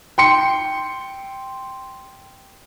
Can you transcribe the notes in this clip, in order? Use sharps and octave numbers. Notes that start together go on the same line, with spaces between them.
G5 C6 C#7